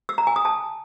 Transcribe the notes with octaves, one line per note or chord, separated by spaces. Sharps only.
E6
A#5
G#5
D#6
A5